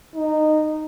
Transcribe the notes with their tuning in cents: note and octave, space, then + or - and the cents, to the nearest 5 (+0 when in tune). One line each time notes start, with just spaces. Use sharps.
D#4 -15